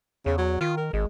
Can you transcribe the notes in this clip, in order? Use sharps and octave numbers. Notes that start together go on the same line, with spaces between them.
E2 C#3
F#3
D#3 F4
A#4
G#1 G#3